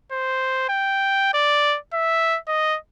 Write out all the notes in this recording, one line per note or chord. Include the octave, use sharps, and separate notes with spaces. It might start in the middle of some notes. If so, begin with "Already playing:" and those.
C5
G5
D5
E5
D#5